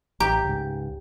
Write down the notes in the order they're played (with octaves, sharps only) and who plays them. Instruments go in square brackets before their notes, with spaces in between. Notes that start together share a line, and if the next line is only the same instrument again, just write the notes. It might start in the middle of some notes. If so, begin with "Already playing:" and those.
[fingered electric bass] A1 [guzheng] G4 [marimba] A#5
[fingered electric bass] C#2 G#2